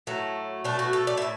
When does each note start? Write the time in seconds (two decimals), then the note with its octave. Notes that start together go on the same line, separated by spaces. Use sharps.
0.07 A2 F#3 A3
0.64 B2 A3 D4
0.79 F#4
0.93 A4
1.07 D5
1.17 A2 E5